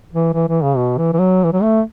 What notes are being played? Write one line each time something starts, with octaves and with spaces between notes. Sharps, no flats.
E3
E3
E3
C#3
B2
E3
E3
F#3
E3
F#3
A3